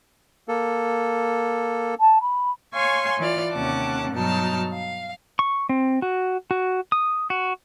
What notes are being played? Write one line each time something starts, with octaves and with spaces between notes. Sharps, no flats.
A#3 A4
A5
B5
C#5 F5 G#5 C6 C#6
E3 F4 D5 F6
D#2 C3 C#4 F#5 A5 D6
G2 B2 F#3 D#4 A5 F6
F5
C#6
C4
F#4
F#4
D#6
F#4